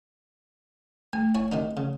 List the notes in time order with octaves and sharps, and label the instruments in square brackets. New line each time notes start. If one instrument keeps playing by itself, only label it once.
[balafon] A3 [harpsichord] G#5
[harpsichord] E4 C#5 G#5
C3 D#3 D#4
C#3